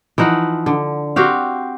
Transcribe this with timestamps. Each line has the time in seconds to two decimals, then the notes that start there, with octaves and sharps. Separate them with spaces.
0.18 E3 F3 D#4 F#5
0.66 D3
1.16 C4 F#4 G4 F5